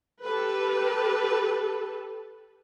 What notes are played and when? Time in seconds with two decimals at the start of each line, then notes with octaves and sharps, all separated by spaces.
0.24 G4 A4 B4